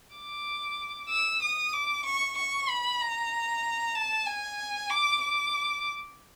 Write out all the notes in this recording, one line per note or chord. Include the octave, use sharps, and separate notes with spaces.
D6
E6
D#6
D6
C#6
C#6
B5
A#5
A5
G#5
D6
D6